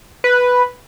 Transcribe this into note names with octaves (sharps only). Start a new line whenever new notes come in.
B4